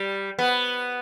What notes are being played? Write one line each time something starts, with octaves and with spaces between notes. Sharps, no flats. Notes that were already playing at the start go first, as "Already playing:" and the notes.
Already playing: G3
B3